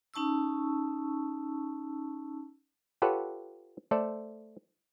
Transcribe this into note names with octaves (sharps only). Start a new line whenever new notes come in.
C#4 D#4 A5 C#6 E6
F4 G4 A4 B4 C#5 F#5
A3 A4 C5 D5